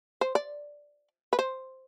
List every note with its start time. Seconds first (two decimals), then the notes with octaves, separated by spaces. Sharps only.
0.21 C5
0.35 D5
1.33 B4
1.39 C5